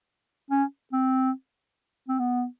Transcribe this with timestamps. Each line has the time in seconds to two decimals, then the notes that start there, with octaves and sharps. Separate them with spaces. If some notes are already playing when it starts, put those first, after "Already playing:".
0.51 C#4
0.93 C4
2.09 C4
2.19 B3